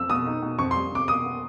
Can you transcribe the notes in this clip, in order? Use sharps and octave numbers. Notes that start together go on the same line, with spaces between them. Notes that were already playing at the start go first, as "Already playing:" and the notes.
Already playing: F2 E6
B2 D#6
D#4
B2
F2 C#6
C6
G3
C3 D6
B2 D#6
B3